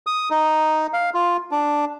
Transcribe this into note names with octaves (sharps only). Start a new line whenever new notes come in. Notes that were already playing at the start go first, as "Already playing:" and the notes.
D#6
D#4
F5
F4
D4